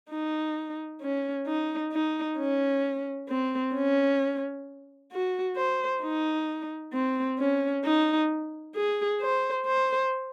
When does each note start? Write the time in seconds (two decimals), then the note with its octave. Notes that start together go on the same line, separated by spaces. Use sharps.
0.11 D#4
1.01 C#4
1.47 D#4
1.92 D#4
2.38 C#4
3.29 C4
3.75 C#4
5.12 F#4
5.56 C5
6.02 D#4
6.93 C4
7.39 C#4
7.85 D#4
8.75 G#4
9.21 C5
9.66 C5